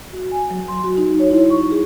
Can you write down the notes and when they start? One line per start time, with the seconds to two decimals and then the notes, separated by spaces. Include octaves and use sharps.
0.13 F#4
0.31 G#5
0.51 F#3
0.68 C6
0.84 F#4
0.97 D#4
1.19 C#5
1.31 E4
1.50 C#6
1.71 G#4